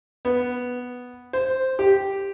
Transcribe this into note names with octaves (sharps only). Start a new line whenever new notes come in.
B3
C5
G4